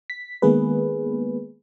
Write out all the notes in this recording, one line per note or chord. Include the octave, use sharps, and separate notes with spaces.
B6
D#3 G#3 A#3 B3 G#4 B4